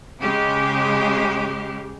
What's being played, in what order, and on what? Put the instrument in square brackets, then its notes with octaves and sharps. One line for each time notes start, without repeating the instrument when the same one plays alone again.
[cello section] C#3 G#3 G4